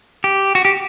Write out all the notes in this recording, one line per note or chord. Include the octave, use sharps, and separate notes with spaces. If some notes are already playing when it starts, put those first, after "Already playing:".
G4
F#4
G4